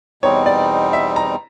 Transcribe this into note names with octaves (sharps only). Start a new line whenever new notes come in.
E2 B2 G3 C4 D#4 C#5
D5
E5
A#5